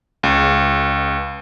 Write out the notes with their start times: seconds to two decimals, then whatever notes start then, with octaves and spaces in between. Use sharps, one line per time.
0.23 C#2